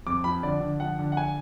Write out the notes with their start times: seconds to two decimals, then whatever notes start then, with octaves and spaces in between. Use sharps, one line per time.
0.07 F2 D6
0.24 F3 B5
0.43 D3 D5
0.61 D3
0.80 F3 F#5
0.99 D3
1.12 F#5
1.17 G#5